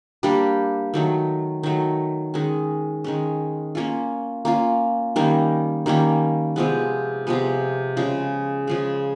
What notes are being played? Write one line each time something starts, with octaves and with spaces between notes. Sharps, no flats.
G3 A#3 D4 G4
D#3 F#3 A3
D#3 F#3 A3
D#3 G#3 C#4
D#3 G#3 C#4
A#3 C#4 F4
A#3 C#4 F4
D#3 G3 A#3 C#4
D#3 G3 A#3 C#4
C3 F3 G#3 B3
C3 F3 G#3 B3
C#3 F3 G#3
C#3 F3 G#3